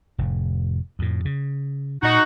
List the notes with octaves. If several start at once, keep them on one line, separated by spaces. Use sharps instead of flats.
F1 A2
F2 A2
C#3
A#2 D#4 F#4